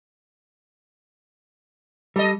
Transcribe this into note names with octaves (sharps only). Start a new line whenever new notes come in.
G3 A4 D#5